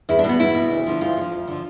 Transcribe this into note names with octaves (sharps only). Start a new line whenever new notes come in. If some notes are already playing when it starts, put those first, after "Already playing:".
E2 E4
D4
B2
B3
E2 E4
B2
D2
D3 F3
D2 F4
D3
F3
F2
D3 F3